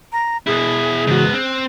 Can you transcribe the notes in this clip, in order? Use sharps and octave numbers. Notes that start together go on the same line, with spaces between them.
A#5
B2 E4 G#4
G#2 C#3 E3 B3 F#4
C4 F#6